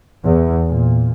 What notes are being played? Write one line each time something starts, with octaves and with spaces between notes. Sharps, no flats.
E2
A#2